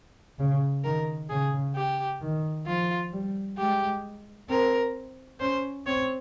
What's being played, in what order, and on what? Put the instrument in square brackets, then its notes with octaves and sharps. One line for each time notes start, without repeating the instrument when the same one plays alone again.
[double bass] C#3
[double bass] D#3 [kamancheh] A#4
[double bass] C#3 [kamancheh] G#4
[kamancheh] G4
[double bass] D#3
[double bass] F3 [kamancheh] F4
[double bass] G3
[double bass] G#3 [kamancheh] G4
[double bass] C4 [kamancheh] A#4
[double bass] C#4 [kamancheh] C5
[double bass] C4 [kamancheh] C#5